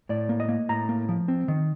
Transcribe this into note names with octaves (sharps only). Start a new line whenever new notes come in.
A2 D5
A#3
D#5
A#3
A2 A#5
A#3
F3
C4
D#3